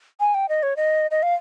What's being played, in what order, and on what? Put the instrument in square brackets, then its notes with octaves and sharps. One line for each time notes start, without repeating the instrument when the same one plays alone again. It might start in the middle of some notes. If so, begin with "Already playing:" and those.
[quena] G#5
G5
D#5
C#5
D#5
D#5
F5